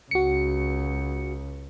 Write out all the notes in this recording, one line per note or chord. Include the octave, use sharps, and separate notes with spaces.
C#2 F#4 C#7